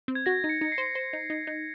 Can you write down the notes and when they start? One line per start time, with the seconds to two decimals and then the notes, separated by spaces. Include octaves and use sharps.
0.08 C4
0.15 G#6
0.26 F#4 A#6
0.44 D#4
0.49 C#7
0.61 D#4 C#7
0.72 C7
0.78 C5
0.95 C5
1.13 D#4
1.30 D#4
1.47 D#4